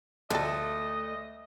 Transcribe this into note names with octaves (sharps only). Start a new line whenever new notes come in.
D2 F3 A3 A4 D#5